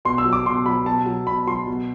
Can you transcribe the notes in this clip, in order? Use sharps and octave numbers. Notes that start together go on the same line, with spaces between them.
B2 C6
E6
F#3
D6
B2 C6
F#3 B5
B2 A5
F#3
B2 B5
F#3 C6
B2